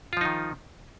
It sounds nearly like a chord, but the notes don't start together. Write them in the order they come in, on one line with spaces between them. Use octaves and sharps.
F4 F3 D#4 D#3